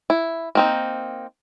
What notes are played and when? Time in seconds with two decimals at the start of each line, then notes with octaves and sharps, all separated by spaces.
0.10 E4
0.55 A#3 C4 D#4